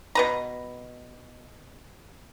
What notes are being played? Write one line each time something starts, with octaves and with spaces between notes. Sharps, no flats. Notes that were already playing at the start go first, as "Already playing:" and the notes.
B2 B4 A#5